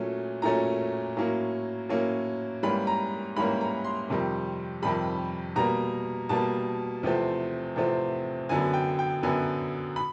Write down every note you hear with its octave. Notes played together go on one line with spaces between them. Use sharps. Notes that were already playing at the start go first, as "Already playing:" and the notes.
Already playing: A#2 F#3 A3 C#4
A#2 F#3 A3 C#4 A#5
A2 F#3 A#3 C#4
A2 F#3 A#3 C#4
G#2 E3 G3 A#3 C#4 B5
A#5
G#2 E3 G3 A#3 C#4 B5
A#5
C6
F2 C3 D#3 G3
F2 C3 D#3 G3 B5
B2 G3 A#3 A#5
B2 G3 A#3 A5
E2 C3 F3 A3 C4
E2 C3 F3 A3 C4
F#2 D3 F#3 B3 G#5
G5
G5
F#2 D3 F#3 B3 G#5
B5